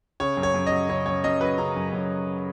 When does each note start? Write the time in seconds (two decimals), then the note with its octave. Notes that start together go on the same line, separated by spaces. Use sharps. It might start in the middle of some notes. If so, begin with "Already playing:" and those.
0.20 C#3 C#5
0.37 F#2
0.43 C#5
0.54 F#2
0.66 D#5
0.72 F#3
0.89 C#3 C#5
1.06 F#2 C#5
1.24 F#2 D#5
1.41 F#3 B4
1.58 C#3 A#5
1.76 F#2
1.93 F#2